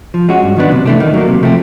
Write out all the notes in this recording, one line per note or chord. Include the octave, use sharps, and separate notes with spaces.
F3
G#3 C#4 F#4
G2
D#3 F#3 B3 D4
C3
E3 A3 D4
D#3
F#3 A#3
C3
F3 A3 C4